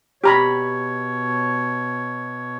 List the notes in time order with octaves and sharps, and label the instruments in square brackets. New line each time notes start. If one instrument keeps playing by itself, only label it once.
[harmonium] B2 C#5 [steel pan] G4 A#5 B5